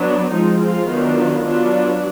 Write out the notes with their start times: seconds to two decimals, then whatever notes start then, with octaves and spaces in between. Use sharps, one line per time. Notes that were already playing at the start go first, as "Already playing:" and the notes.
Already playing: F#3 B3 D4
0.31 F3 G#3 C4 D#4
0.61 F4
0.89 D#3 F#3 B3 D4
1.18 F4
1.46 F#3 B3 D4 F4